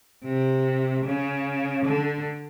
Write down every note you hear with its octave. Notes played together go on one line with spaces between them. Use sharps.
C3
C#3
D3